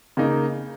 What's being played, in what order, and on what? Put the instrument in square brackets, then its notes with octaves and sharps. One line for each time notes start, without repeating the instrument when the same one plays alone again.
[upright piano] C#3 A#3 D#4